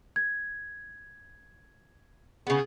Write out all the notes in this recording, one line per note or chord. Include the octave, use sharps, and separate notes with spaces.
G#6
C#3 B3 G#4